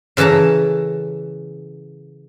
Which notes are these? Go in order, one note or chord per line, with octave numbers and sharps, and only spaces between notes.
C#3 E3 A4 A5 A#5